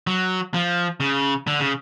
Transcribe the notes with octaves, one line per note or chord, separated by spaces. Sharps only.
F#3
F3
C#3
D3
C#3